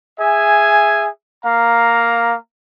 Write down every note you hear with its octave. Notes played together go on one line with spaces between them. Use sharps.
G#4 E5 G#5
A#3 F5 A#5